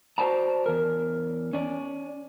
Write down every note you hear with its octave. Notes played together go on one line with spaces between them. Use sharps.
F#4 C5 D5 A5 A#5
E2 A#4
C#4 D5